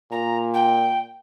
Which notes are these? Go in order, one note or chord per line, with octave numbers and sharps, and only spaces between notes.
A#2 A#5
G5